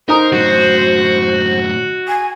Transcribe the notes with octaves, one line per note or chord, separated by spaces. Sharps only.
D#4 A#4 C5 A#5 D#6
F#2 A2 F#4
G#5